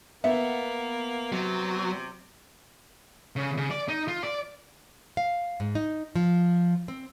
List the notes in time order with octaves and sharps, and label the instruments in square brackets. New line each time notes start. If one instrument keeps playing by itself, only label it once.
[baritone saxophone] A#3 [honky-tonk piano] B3 [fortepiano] E5
[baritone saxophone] C3 [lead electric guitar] F#3
[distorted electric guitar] C#3
C#3
D5
D#4
F4
D5
[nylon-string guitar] F5
G#2
D#4
F3
C4